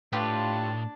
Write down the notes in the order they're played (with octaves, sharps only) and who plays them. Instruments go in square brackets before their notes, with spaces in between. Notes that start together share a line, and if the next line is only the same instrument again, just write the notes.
[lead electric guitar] A2 [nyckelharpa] D4 A5 [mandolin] F4 G4 B4